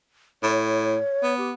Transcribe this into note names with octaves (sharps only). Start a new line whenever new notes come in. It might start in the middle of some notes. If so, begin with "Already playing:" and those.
A2 C#5
B3
G4